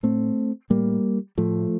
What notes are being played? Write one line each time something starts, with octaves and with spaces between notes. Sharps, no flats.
A2 A3 C4
A2 G3 A#3
A2 F3 A3